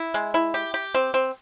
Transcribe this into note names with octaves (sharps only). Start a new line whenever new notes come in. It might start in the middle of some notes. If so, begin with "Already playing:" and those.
Already playing: E4
G#3
E4
G4
G4
C4
C4